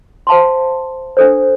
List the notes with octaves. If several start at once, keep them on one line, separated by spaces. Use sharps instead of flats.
C5 F5 A5 C6
D4 A4 C5